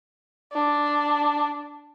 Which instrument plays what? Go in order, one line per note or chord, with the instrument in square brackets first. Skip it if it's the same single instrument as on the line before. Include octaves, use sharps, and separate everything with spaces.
[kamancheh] D4